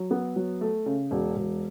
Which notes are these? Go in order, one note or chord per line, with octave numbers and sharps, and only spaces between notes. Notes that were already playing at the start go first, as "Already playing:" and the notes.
Already playing: F#3
B3
F#3
A3
C#3
E1
E1